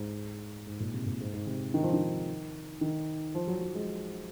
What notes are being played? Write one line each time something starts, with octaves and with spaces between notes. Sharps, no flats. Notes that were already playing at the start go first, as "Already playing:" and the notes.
Already playing: G#2
G#2
A#2
C3
A#2
G#2
G#2
C3
D#3
F3
D#3
D#3
F3
F#3
F#3
G#3